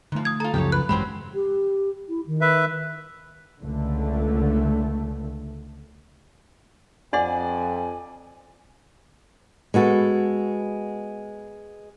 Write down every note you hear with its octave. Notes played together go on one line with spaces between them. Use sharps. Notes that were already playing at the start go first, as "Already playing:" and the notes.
G#2 D3 F3 A3
D#6 G#6
F4 A4 A#5
C#2 F#2 C#3 F3 F#3 G4 A4 C#5
B4 F#6
G#1 F#2 E3 F#3 G#3 C4 G4 B5
G4
E4
D#3
B4 E5
C#2 D3 A3
F2 D4 D5 F#5 G#5 C6
G#3 B3 F#4 A4